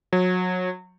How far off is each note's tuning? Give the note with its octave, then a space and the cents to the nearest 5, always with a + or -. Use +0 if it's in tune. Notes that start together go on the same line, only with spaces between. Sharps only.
F#3 -25